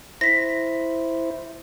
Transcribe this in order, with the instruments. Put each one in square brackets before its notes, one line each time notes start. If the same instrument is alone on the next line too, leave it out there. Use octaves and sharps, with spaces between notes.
[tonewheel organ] E4 C5 [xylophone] A#6 B6